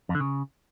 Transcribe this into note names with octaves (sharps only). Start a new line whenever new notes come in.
F2
D3
C#3